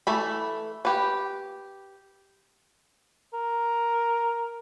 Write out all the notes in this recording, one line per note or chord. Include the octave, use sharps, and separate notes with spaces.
E3 A3 B5
G4 B4
A#4